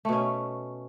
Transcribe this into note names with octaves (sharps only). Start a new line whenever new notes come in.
B2 A3 C#4